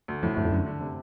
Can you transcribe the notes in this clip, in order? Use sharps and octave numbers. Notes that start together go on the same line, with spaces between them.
D2
F2 A2
G2 A3
F2
F#2 D3
D3
C3